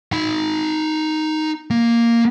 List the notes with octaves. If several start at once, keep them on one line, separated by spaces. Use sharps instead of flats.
D#4 B5
A#3